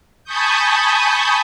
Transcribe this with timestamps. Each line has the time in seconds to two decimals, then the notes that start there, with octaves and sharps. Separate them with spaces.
0.24 G#5 A5 B5 C#6 D#6 G6